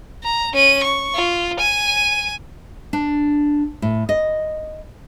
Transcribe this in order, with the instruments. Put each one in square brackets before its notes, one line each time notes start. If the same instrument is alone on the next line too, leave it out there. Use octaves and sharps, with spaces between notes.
[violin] A#5
C#4 D#7
C#6
F4
G#5 D#7
[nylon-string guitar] D4
A2
D#5